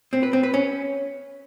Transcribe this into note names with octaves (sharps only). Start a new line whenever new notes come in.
C4
B4
C4
B4
C#4